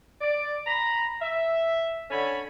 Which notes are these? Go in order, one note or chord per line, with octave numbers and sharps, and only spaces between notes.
D5
A#5 B5
E5
D3 C#4 A4 C#5 G#5 B5